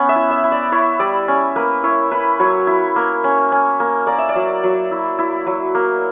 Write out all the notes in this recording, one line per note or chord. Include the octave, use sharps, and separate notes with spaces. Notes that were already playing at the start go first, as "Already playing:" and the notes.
Already playing: B3 C#4 F#5
E5
E4
E5
E4
D5
E4 C#5
G3 D5
C#4
A#3 B4
E4 C#5
E4 B4
F#3 C#5
E4
A#3
C#4
C#4
A#3
A#3 D5
E5
D5
F#3
F#3
E4
E4
F#3
A#3